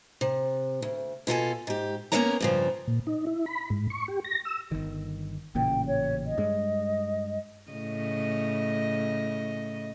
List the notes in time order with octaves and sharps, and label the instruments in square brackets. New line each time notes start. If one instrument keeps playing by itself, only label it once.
[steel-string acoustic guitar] C3
D2
B2 F4 A4 G#5
G#2 G4
A#3 B3 C#4 D4 C#5 A#5
G2 C#3 F3
[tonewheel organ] A#2
D#4
E4
B5
G#2
C#6
G4
A#6
E6
[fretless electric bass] G1 D#3
[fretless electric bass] A1 A#2 C#3 [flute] G5
[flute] C#5
D#5
[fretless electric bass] G2 G#3
[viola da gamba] A2 C#3 D#5